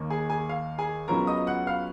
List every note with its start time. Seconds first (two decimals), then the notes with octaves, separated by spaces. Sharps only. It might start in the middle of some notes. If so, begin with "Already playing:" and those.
Already playing: D#2 D#3 A#3
0.10 G#4 G#5
0.30 G#4 G#5
0.49 F5
0.78 G#4 G#5
1.08 C#2 C#3 F#3 B3 F4 A#4 A#5
1.27 D#5 D#6
1.47 F#5 F#6
1.67 F5 F6